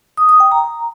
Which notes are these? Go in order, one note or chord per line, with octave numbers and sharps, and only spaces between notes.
D#6
D#6
G5
A#5